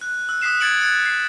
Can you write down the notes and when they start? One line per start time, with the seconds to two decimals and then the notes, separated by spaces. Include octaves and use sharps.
0.01 F#6
0.29 E6 F#6
0.42 D#6 F#6 B6 C7 E7
0.60 G#6 A6 C#7 D7 F#7
0.80 F#6 G#6 A6 C#7
1.06 C7